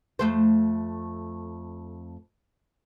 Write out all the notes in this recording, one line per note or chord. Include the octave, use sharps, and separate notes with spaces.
F2 A3 C5